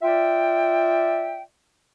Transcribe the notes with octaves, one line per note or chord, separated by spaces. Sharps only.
F4 D5 E5 G5